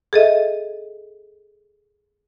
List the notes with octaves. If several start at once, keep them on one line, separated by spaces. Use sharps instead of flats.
G#4 A4 D#5 E5